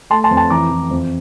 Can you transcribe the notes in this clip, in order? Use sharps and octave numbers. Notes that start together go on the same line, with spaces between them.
A3 A5 C6
A5 C6
F2
A5 C6
E3 A#5 D6
E3
F2